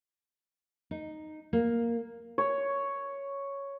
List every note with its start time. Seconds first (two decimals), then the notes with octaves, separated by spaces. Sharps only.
0.91 D#4
1.53 A#3
2.38 C#5